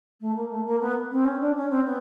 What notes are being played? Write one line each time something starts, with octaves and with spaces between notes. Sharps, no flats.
A3
A#3
A3
A#3
B3
C4
C#4
D4
C#4
C4
B3